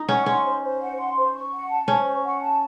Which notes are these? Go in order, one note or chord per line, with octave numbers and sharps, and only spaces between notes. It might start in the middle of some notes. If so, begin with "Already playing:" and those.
Already playing: D#4
C#4 F#5
C#4 C6
C5
C5
F#5
C6
C5
C#6
F#5
A5
C#4 C5
C#6
F#5
A5